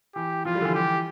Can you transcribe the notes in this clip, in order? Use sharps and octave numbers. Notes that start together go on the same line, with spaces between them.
E3 G4
F3 F4
G3
D3
E3
G4